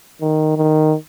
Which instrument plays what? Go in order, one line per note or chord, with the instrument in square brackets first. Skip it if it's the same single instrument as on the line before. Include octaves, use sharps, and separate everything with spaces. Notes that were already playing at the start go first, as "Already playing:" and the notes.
[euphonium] D#3
D#3